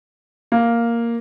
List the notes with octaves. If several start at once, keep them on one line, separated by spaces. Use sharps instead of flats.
A#3